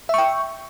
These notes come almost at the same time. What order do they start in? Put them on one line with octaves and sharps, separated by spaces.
E5 C#6 G5